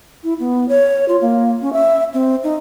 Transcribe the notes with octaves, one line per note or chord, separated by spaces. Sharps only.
E4
B3
C#5
F4
A#3
C#4
E5
C4
D#4